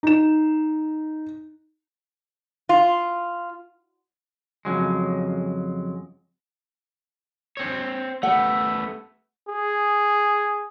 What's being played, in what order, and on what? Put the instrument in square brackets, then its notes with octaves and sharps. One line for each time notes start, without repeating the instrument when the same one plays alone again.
[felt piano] D#4 E7
[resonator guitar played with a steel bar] F4
[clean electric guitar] F2 C#3 F#3 G#3
[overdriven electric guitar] C4 C#5
[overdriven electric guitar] A3 B3 [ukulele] G4 F#5
[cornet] G#4